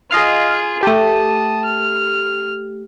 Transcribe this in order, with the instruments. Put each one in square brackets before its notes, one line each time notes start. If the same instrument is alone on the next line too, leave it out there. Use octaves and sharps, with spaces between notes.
[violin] F4 G#4 [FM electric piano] D#5 F5 F6
[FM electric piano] A3 G4 [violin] A5 D#6
[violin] F6